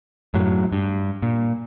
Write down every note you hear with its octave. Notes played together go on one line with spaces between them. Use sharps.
F#2 A2 F#3
G2
A#2